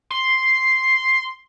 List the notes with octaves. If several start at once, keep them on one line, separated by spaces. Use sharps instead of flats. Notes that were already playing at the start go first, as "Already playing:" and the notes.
C6